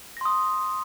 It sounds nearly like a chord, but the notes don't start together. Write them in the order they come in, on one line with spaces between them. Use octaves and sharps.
A#6 C6 D#6